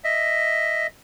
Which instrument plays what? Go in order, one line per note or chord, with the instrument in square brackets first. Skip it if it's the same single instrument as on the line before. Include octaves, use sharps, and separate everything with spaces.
[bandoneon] D#5 E5